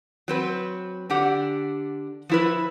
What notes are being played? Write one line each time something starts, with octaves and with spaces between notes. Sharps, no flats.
F#3 C4 B4
D3 D4 G4 F#5
F3 E4 B4